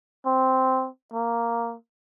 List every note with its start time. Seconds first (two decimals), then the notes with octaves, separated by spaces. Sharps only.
0.26 C4
1.13 A#3